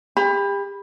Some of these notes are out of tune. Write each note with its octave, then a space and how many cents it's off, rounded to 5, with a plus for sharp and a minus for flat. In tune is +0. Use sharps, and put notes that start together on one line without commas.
G4 +35 B5 +0